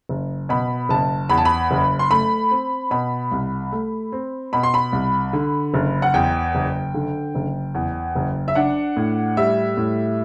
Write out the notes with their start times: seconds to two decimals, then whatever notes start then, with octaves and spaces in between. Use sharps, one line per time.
0.09 F#1
0.49 B2 B5
0.89 F#1 A5
1.30 E2 B5
1.37 A5
1.45 B5
1.71 F#1
1.99 C6
2.11 A3 B5
2.51 C4
2.91 B2 B5
3.32 C2
3.72 A3
4.12 C4
4.53 B2 B5
4.63 C6
4.74 B5
4.93 C2
5.33 D3
5.74 F#1
6.02 F#5
6.14 E2 G5
6.55 F#1
6.94 D3
7.35 F#1
7.75 E2
8.16 F#1
8.48 E5
8.55 D4 F#5
8.97 A2
9.37 G3 E5
9.77 A2